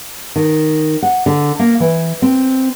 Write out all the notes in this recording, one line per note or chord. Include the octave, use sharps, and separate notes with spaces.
D#3
F#5
D3
A#3
E3
C4